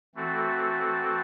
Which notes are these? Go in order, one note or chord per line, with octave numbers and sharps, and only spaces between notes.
E3 A3 C4 F#4 A4